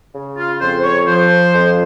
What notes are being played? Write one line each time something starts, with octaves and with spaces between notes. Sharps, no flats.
C#3
F4
F2 C5
C5
C#5
F3 C5
F2